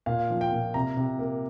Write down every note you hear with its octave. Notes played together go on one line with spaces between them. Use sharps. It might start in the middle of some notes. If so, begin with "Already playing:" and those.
A#2 F5
F3
G5
A#2
C3 A#5
C3
A#3